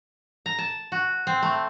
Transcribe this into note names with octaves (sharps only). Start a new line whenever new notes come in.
A#5
A5
F#4
C4
A3